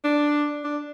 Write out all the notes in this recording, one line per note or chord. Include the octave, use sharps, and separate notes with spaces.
D4
D4